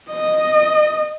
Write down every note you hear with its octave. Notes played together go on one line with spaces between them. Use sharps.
D#5